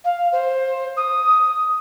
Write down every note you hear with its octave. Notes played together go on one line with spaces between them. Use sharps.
F5
C5
D#6